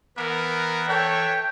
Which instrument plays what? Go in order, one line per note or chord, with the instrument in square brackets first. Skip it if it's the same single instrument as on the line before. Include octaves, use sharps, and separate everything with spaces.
[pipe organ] E3 E5 [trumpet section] B3 A#4
[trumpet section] A4 C#5 [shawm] G5